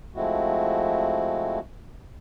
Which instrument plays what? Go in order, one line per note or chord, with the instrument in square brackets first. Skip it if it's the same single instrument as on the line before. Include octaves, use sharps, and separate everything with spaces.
[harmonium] F3 G#3 A3 C4 E4 F#4